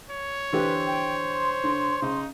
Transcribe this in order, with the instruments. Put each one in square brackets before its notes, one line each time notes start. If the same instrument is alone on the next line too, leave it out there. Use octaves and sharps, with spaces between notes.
[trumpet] C#5
[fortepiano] D3 E3 G4 [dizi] B4 [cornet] C5
[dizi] G5
C6
[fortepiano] D3
[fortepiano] C#3 [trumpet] D#4